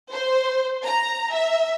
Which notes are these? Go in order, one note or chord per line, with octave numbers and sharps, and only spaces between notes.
C5
A#5
E5